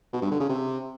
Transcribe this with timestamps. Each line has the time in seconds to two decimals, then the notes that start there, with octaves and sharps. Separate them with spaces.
0.13 B2
0.22 G2
0.31 D3
0.40 C#3
0.50 C3